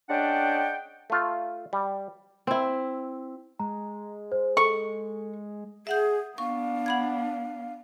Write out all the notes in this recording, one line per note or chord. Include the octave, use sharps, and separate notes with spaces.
G#3 C#4 D4 D5 F#5 G5
A3 F4
G3
C4 E4
G#3 A#5
C5
A4 C#6
G#4 E5 F#5 G6
B3 D4 F5 C#6
F#5 B5 G#6